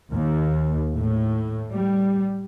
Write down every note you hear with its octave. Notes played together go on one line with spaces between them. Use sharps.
D#2
A2
G3